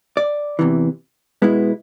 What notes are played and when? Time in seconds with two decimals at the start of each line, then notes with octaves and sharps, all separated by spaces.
0.17 D5
0.59 E2 C3 E3
1.42 B2 G#3 B3 E4